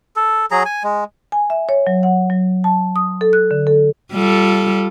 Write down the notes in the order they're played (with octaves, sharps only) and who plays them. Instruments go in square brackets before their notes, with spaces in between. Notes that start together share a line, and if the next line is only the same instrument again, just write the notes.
[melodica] A4
F#3 G#4 A#5
G#5
G#3
[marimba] G#5
E5
C#5
F#3
F#5
F#3
A5
D#6
A4
F#6
D3
A4
[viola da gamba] G3 F4 A4